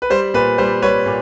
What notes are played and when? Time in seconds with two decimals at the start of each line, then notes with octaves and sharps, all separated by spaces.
0.02 B4
0.10 G3 C5
0.34 A#2 B4
0.58 G3 C5
0.82 G3 B4 C#5
1.06 A#2